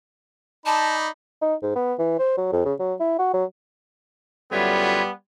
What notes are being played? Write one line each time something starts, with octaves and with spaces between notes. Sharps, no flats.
D#4 D5 A5 B5
D#4
G#2
B3
E3
C5
F#3
F2
C#3
F#3
E4
F#4
F#3
F#2 D3 G3 B3 F4 C#5 E5